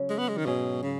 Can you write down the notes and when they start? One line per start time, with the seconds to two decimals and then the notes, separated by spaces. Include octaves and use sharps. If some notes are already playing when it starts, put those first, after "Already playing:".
Already playing: C#3 F#3 C#4
0.10 G#3
0.19 B3
0.29 G#3
0.37 D#3
0.46 G#2 B2 F#3 C#4 G#4
0.83 C#3